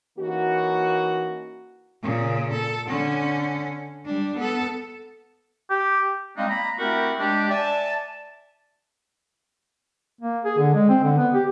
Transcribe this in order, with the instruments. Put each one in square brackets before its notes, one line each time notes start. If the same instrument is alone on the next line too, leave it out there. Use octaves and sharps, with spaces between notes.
[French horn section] E3 A#3 C#4 D#4 F#4
[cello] A#2 C#3
A4
D3 C#4
G3 D4
B3 A4
[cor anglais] G4
[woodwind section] G3 G#3 C4 D4 D#4 F5
A#3 A#5 B5
A3 C4 E4 F#4 G4 A#4
G#3 D4 G4
D5 E5 G#5 A5
[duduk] A#3
G#4
D3
G#3
C4
D3
B3
G4